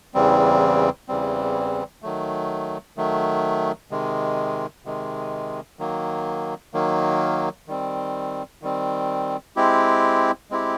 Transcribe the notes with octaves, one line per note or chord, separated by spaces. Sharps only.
E2 C#3 E3 G3 C4
E2 C#3 E3 G3 C4
D#3 F#3 A3
D#3 F#3 A3
C3 D#3 G#3
C3 D#3 G#3
D#3 F#3 A#3
D#3 F#3 A#3
D#3 G3 C4
D#3 G3 C4
G#3 C4 E4 G4
G#3 C4 E4 G4